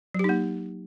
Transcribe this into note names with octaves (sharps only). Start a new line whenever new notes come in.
F#3 A#3 D#4 G4